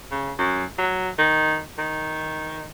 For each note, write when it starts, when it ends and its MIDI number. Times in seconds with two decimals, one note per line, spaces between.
0.11 0.32 49
0.38 0.64 42
0.78 1.09 54
1.18 1.60 51
1.78 2.66 51